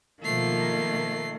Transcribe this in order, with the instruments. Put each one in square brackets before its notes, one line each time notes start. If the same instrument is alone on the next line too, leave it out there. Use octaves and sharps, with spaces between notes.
[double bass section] B2 F3 [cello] D#3 A#3 [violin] A3 C7